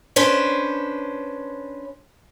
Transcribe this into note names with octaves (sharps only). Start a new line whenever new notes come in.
C#4 D4 B4 C5